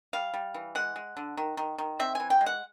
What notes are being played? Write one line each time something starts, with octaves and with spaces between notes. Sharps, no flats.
G3 F5
G3
E3
G#3 F#5
G#3
D3
D#3
D#3
D#3
C4 E5
E3 G#5
G5
G#3
F#5